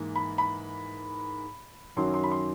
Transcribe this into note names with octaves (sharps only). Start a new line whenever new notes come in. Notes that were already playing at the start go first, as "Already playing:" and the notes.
Already playing: G#2 E3 A#3
B5
B5
F#2 D#3 F#3 C6
C6
B5
C6